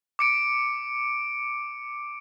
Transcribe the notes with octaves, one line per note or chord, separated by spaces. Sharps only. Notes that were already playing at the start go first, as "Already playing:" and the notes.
D6 C#7 D7